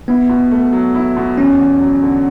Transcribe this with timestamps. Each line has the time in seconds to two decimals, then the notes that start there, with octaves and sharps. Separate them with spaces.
0.08 B3 E4
0.29 B2
0.51 A3
0.73 F#3
0.95 E4
1.17 B2
1.38 E2 C#4
1.59 E2
1.80 F#3
2.02 D3